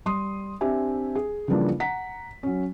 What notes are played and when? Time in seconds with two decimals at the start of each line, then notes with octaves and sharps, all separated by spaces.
0.06 G3 C6 D#6
0.61 C4 D4 G4 E5 G#5
1.15 G#4
1.48 C#3 E3 F3 G3 A#3 D4
1.80 F#5 A#5 B6
2.43 F#3 C#4